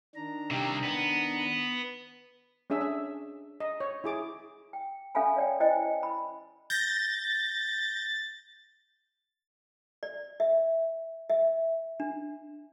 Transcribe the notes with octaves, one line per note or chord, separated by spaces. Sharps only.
D#3 D4 A#5
C3 G3
B3
C#4 D4 G#4 E5 E6
E5
D#5
C#5
E4 G#4 D6
G5
C#4 A4 E5 F5 G#5 B5
C#5 D5 G5
E4 C5 D5 D#5 G5 G#5
B5
G6 A6 A#6
D5
E5
E5
D4